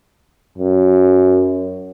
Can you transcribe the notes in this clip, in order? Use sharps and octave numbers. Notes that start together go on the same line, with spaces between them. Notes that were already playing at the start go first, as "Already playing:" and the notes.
F#2